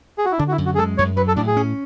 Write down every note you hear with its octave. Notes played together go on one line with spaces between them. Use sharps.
G#4
F#4
E4
D3 D4
F#4
E4
F#2
F#4
G#4
G#3 A4
F#2 C#5
F#3 B4
A4
A2 D4
G#4
C#4